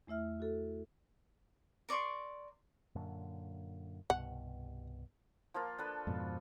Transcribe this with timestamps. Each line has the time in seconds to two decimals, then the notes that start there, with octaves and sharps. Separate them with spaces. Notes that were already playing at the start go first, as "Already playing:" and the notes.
0.07 E2 A3 E4 E5 F6
0.40 F#4 A4
1.89 A#4 D5 C6 C#6
2.95 F#2 A#2 D3
4.10 C2 G2 B2 F#5
5.54 F3 A#3 F4
5.78 D4 A4 B4
6.07 F2 G#2 B2